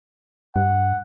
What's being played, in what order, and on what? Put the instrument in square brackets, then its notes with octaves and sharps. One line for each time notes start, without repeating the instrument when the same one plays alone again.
[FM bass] G2 [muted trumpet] F#5